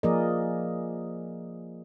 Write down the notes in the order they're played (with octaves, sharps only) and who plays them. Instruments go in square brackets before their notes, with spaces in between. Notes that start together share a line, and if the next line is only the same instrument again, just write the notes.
[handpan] F3 A#3 G#4 A#4 D5 D#5